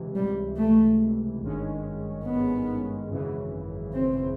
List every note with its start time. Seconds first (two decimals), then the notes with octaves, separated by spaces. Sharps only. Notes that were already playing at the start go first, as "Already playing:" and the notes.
Already playing: C#2 C3 E3
0.16 G3
0.57 A3
1.42 G#1 G2 D#3 G#3 C#4
2.25 B3
3.09 G#1 F#2 C#3 E3
3.93 C4